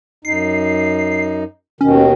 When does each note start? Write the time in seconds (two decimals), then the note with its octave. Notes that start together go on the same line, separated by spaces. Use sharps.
0.25 F#2 D#4 C7
1.81 D#2 B2 D#3 C#4